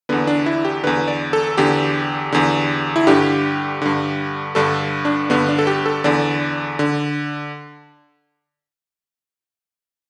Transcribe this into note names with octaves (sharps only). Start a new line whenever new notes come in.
E2 D3 B3
D4
E4
G4
E2 D3 B4
D5
A4
E2 D3 G4
E2 D3
E4
G2 D3 G4
G2 D3
G2 D3 A4
D4
G2 D3 B3
D4
A4
G4
A4
E2 D3 D5
D3